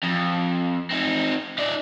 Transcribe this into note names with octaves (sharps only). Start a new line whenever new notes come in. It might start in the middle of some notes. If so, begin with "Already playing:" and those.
F2
C4 D#4
D#4 D5